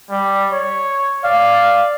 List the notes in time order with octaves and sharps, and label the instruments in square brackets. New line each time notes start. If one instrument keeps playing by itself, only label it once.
[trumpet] G3
C#5
[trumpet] D5 [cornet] F5